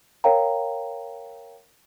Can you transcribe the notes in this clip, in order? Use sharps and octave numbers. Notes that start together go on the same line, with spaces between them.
A#4 C#5 F5 G5 A#5